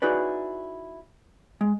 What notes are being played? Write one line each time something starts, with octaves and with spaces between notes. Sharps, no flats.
D#4 E4 F#4 G#4 B4 D5
G#3